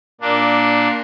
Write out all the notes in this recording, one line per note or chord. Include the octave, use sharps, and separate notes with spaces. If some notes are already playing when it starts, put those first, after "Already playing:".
A#2 A#3 D4